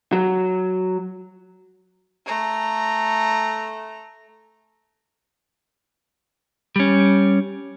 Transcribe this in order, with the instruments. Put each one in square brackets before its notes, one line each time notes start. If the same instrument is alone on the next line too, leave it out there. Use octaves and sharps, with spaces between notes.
[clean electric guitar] F#3
[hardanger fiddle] A3 A#5
[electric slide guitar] G3 C#4